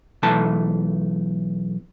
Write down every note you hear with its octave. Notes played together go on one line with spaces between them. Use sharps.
B1 E3 A3 A5